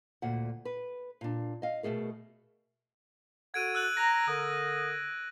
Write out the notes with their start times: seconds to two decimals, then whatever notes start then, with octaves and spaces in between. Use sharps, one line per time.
0.22 D2 A#2 F#5
0.65 B4
1.21 A#2 D4
1.62 D#5 F5
1.83 B2 D#3 A3 G#4 A#4
3.54 F#4 A4 F#5 G#6 D7 D#7
3.75 E6 F#6 F#7
3.97 A#5 A#6
4.27 D3 A#4 D#6